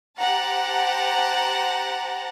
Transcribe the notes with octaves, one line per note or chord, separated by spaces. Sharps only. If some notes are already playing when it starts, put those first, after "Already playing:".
G4 C5 F#5 A5 A#5